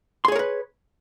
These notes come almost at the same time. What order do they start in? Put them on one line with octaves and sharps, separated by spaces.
C6 G#4 C#5 A#4 B4